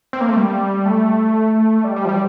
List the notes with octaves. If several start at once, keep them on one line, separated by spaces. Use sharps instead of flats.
C4
A#3
A3
G3
A3
G3
G3
F3
G3